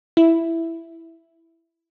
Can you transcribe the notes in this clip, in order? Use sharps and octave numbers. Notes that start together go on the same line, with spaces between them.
E4